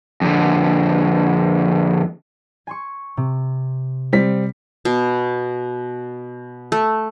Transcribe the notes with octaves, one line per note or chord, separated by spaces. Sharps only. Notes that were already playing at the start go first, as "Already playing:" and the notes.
F2 D3
G#5 C6 C#6
C3
G3 C4 B6
B2
A3